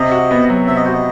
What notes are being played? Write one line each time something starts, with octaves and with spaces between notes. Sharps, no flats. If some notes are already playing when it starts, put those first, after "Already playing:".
Already playing: C3 D#5
F#4
B3
F#3
C3 E5
D#5
F#4 C5
D#5